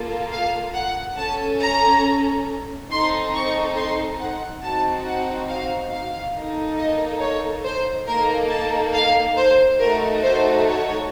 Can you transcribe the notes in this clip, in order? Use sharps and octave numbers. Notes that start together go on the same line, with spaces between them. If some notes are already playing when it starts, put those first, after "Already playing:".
Already playing: A#3 F4 A4
F5
F#5
C#4 A4 A5
A#5
C4 D#4 A4 C6
C#6
C6
F#5
C4 D#4 F#4 A5
F#5
F5
F5
A#3 D#4 A4
D#5
C#5
C5
A#3 D#4 A4 A#4
A5
F5
C5
A3 D#4 F#4 A4 A#4
C5
C#5